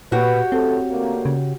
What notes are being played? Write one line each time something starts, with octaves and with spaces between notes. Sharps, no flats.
A#2 F#4 G4 B4 C#5
A2 C#3 C4 A4
D3 A3 A#3
C#3